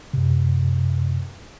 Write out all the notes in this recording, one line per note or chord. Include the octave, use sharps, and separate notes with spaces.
F#2 C3